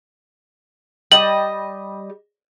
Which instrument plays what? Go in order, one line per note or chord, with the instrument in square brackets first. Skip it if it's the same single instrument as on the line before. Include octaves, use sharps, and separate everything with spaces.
[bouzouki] G3 D#5 [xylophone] F#7